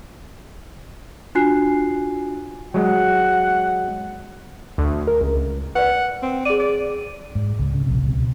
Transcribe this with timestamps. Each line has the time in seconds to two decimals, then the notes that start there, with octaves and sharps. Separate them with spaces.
1.35 D4 F4 F#4 G#5 F#6 C7
2.74 F#3 G#3 F#5
4.78 D2
5.07 A#4
5.21 C#2
5.75 B4 D5 F#5
6.22 C4
6.45 G#4 D5 D#7
6.60 D5
7.35 G#2
7.59 C#2
7.74 C#3
7.86 D1 A#1 C3
8.02 C#2 B2